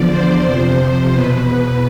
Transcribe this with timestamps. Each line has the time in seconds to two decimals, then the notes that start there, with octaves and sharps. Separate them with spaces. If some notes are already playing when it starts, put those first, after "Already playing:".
Already playing: E2 D3 F3 D5
0.09 C5
0.43 F2 C3 F3
1.12 E2 B2 B4